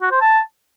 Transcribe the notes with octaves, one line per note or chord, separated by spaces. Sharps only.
F#4
C5
A5